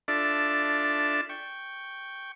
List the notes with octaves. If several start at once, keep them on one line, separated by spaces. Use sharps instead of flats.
D4 F4 A4 D5 E5
G5 C#6